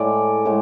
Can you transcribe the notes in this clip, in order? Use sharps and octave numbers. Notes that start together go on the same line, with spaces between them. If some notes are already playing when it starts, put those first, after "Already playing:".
Already playing: A2 G#3 D5
A2 G#3